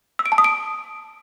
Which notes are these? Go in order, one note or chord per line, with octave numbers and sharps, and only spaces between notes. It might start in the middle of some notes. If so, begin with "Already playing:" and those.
E6
D7
A5
D#6
D7